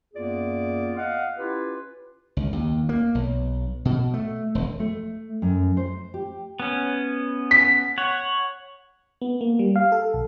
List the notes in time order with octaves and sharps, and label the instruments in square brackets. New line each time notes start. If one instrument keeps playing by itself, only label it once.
[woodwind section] F#2 A#3 B3 F4 G#4 D5
D#5 F5 F#5
C#4 E4 F4 G4 B4
[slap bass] C#2
D#2
A#3
B1
B2
A3
E1
[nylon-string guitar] A3
F#2
C5
G4
[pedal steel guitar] B3 C#4
[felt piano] B6
[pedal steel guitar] C#5 F#5
[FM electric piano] B3
A#3
G3
F5
A4
B1